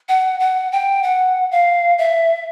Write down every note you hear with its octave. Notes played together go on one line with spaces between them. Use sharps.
F#5
F#5
G5
F#5
F5
E5